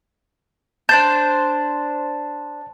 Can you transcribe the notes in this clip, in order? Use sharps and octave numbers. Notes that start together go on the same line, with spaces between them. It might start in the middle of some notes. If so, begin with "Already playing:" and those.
D4 C5 A5 G6